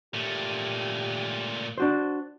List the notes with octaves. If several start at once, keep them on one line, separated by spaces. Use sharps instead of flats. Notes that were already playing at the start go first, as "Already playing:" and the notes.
A#2 A3 G4
D4 F#4 C5